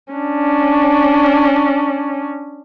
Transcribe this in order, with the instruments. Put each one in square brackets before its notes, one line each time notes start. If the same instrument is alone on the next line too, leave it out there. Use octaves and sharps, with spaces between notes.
[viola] C#4 D4